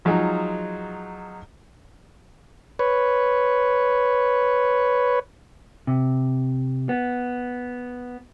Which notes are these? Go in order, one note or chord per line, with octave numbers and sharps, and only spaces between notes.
F3 F#3 G#3 D#4 F4 G#4
B4 C#5
C3
B3